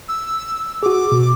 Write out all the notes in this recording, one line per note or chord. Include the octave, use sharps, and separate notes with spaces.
E6
F#4 G#4 D6
B2